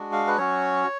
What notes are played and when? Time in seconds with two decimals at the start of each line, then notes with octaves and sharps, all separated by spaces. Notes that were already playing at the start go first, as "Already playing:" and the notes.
Already playing: G#3 D4 F#4
0.12 F5
0.27 B4
0.38 F#3 C#4 F#4 C#5